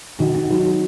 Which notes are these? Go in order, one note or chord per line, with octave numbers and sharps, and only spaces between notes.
D#3 F#4
F#4
F#3 D#4
F#4